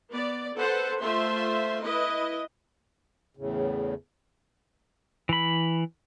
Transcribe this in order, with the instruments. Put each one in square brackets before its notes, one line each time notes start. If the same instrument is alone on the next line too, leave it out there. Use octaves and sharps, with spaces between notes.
[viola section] B3 D5
A4 B4 C5 F#5
A3 F4 C5 E5 C6
E4 B4 D#5
[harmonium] E2 A2 C#3
[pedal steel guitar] E3 B5